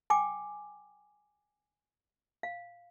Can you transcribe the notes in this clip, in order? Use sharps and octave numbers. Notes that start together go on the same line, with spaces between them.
G5 G#5 D6
F5